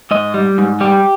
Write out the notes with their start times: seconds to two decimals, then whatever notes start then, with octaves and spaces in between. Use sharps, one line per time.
0.11 G#2 D#5
0.34 G3
0.58 G#2
0.80 G3 G4